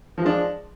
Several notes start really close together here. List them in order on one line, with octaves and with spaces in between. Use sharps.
F3 G#3 D4